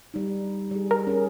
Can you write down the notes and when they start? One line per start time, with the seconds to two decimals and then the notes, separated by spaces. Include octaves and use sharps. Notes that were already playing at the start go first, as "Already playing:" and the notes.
0.14 G3 D#4
0.71 G3 G#4
0.91 A#4
1.07 C#4 G#4